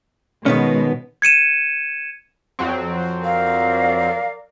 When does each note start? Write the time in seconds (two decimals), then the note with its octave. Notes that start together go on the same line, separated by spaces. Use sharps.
0.46 B2 D#3 G#3 B3 C#4
1.22 G#6 C#7 D#7 E7
2.59 F2 F#3 C4
3.25 A#4 D5 F5